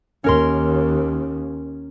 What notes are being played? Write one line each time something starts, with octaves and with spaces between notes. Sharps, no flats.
D#2 C#4 A#4 C6